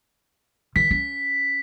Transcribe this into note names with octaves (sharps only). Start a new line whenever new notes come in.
D#3 B6
C#4